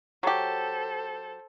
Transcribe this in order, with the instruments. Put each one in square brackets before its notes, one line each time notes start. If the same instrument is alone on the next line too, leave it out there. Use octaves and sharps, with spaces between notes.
[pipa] F#3 G4 [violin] A4 C5